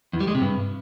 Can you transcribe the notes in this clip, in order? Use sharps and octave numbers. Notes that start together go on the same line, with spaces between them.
E2
G3
G#3
C3
G2